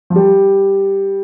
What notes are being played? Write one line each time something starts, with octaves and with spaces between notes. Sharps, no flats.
F3
G3